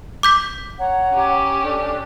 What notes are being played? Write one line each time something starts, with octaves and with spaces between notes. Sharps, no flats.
D6 G6 B6
C#5 F#5 A#5
C#4 G4
D4 A4